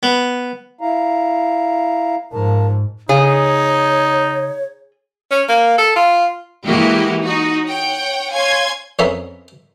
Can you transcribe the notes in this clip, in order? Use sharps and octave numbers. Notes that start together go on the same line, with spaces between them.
B3
E4 F5 A#5
G#2 F3 A#4 A5
C#3 D#4 G#4 C#5
C#4
A#3
A4
F4
E3 G#3 A#3 E4 F#4 G4
D#4 F#4
C#5 F#5 G5
C#5 F5 G#5 C6 G#6
F2 B3 C#4 A#4 E5 C6